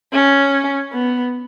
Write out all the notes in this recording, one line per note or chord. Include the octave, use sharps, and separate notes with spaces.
C#4
B3